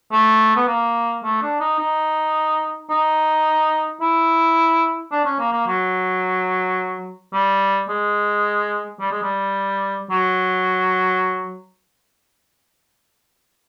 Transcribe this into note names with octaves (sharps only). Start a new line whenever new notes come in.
A3
B3
A#3
A3
D4
D#4
D#4
D#4
E4
D4
C#4
A#3
A#3
F#3
G3
G#3
G3
G#3
G3
F#3